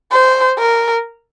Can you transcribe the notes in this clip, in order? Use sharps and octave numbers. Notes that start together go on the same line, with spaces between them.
C5
A#4